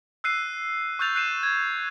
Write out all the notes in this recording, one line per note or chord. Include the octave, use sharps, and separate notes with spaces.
E6 F#6 C7 D#7
C#6 E6 F#6 G6 A6 F7
F#6 C7 D#7 E7
G#6